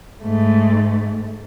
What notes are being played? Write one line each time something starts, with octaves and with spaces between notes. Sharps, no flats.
G#2 A3